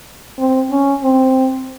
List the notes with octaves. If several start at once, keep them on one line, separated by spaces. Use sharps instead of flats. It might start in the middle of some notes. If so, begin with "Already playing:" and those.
C4
C#4
C4